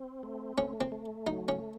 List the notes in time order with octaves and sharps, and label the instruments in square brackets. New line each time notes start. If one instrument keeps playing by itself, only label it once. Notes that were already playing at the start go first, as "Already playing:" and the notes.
Already playing: [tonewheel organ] C4
A3
[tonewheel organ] A3 [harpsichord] C#4
[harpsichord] C4
[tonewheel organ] A3
[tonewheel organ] F#3 [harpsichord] D#4
[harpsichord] C#4